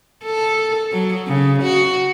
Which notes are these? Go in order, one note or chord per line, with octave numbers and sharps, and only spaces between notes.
A4
F#3
C#3
F#4